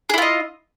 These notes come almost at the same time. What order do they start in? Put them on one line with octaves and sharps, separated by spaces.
G#4 E4 F4 D#5